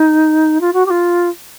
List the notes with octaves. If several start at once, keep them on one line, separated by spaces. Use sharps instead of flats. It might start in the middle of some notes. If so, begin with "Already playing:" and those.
Already playing: D#4
F4
F#4
G4
F4